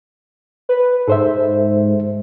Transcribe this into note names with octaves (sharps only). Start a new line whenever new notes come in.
B4
G#2 A4 C5 E5